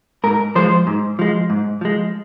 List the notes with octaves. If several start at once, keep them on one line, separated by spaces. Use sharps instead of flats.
G#2 A#4
F3 G#3 C5
G#2
F3 G#3
G#2
F3 G#3